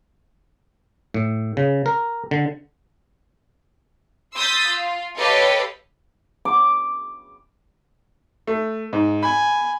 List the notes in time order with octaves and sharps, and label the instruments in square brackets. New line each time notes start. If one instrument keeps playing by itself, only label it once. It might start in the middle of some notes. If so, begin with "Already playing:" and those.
[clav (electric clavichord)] A2
C#3
A#4
D3
[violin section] C6 D#6 E6 G6 A6 B6
F4
G4 A4 B4 C#5 D#5 F5
[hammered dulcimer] D6
[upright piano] A3
G#2
[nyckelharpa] G#5 [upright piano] B5